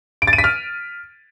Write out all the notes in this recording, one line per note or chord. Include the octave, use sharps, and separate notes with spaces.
D7
A6
D#7
B6
F6